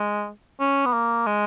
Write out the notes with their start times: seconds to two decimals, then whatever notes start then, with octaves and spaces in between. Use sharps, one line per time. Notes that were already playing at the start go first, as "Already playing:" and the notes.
Already playing: G#3
0.60 C#4
0.86 B3
0.93 A#3
1.26 G#3